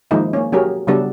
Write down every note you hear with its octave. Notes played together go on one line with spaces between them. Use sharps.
D#3 F3 G#3 A#3 D#4 E4
A#3 C#4
F#3 C#4 G4 G#4 A#4
C#3 F#3 G3 B3 D4 A4